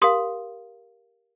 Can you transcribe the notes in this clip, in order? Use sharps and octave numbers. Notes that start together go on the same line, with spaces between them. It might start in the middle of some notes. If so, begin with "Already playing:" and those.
G4 A#4 F5 C6 D#6